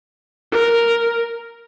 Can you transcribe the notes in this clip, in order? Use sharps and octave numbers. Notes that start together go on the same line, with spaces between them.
A#4